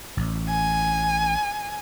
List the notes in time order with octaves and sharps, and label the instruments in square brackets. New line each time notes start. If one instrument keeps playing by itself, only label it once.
[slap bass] A1
[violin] G#5